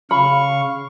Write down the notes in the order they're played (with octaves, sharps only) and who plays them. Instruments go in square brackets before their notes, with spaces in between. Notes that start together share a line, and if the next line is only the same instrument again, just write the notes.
[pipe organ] C#3 F5 C#6 [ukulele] B5